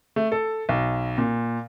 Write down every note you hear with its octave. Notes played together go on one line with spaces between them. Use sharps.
A3
A4
B1
A#2